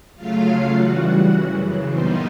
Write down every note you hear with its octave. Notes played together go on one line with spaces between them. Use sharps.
C#3 F#3 A3 F4 F5
C#3 E3 G3 F#4 F#5
F#2 C#3 E3
A#2 G3 B3 D#4 C5 C6